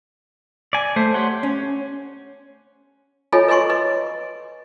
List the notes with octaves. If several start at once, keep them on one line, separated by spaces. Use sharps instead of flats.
D5 G#5
A3 C5
G4 C#5 F#5 C6
C#4
F4 A4 C#5 D#5 G#5 B5
B4 D#5 G#5 C6 C#6
B4 D#5